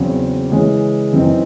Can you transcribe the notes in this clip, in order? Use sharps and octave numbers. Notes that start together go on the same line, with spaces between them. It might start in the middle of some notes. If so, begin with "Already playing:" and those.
Already playing: E2 C#3 F#3 C4
C#3 E3 G#3 C#4
F#2 E3 C4 D#4